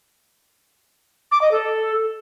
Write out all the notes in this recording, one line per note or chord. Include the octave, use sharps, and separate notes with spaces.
D6
D#5
A4